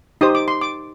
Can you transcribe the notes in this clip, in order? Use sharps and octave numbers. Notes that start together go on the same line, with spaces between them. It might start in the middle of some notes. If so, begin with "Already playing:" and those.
D#4 G4 C5 D#6
D6
C6
D6